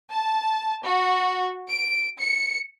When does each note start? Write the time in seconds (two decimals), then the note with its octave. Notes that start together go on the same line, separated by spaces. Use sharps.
0.12 A5
0.84 F#4
1.68 D7
2.19 C#7